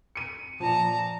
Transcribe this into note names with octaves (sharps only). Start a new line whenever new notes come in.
C#7 D#7
A#2 F3 A5 A#5